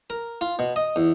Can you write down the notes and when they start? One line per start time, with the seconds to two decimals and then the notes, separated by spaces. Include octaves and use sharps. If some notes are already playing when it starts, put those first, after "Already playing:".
0.10 A#4
0.41 F4
0.59 B2
0.76 D#5
0.96 E2